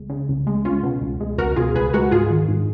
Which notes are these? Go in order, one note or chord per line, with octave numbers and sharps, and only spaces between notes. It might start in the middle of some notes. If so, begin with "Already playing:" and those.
Already playing: C#2 G#3
C#3
C#2
G#3
C#2 C#4 F4
B2
C#2
G#3
C#2 F#4 A#4
B2 F4 G#4
C#2 G#4 B4
G#3 F#4 A#4
G#2 F4 G#4
D#3
G#2